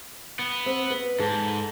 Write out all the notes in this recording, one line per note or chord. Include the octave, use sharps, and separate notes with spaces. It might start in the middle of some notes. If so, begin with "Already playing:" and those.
B3
C4
B4
G#2 A4